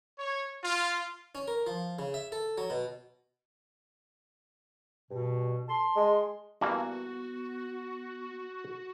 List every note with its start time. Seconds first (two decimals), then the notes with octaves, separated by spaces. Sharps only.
0.18 C#5
0.63 F4
1.35 C#4
1.48 A#4
1.67 F3
1.99 C#3
2.14 E5
2.32 A4
2.58 F#3
2.70 B2
5.10 G2 B2
5.69 A5 C6
5.96 G#3
6.61 G2 E3 A#3 B3 F#4